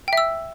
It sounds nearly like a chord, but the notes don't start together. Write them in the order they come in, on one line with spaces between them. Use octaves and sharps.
G5 E5 E6